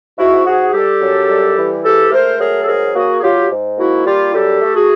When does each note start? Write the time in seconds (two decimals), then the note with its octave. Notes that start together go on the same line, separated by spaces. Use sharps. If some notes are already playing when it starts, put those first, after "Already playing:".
0.18 G#2 E4 F#4
0.46 G#2 F#4 G#4
0.73 G3 G4 A4
1.01 F#2
1.30 G3
1.57 E3
1.84 G#2 G4 A4
2.12 A3 A#4 C5
2.40 F#3 G#4 A#4
2.61 A4
2.67 G#2 G#4 A#4
2.95 A#3 F#4 G#4
3.19 G#4
3.23 F#3 F4 G4
3.50 G#2
3.78 A#3 E4 F#4
4.06 G3 F4 G4
4.34 F#2 G4 A4
4.61 A3
4.75 F#4 G#4